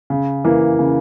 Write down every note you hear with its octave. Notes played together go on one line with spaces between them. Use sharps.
C#3
E3 A#3
C#3